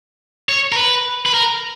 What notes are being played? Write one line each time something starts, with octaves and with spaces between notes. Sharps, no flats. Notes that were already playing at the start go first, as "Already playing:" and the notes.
C#5
A#4
B4
B4
A#4